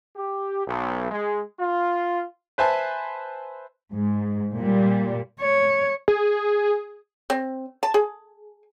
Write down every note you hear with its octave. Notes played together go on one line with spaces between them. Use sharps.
G4
B1
G#3
F4
B4 C5 E5 G#5 A5
G#2
A#2 G3
C#5
G#4
C4
A5
G#4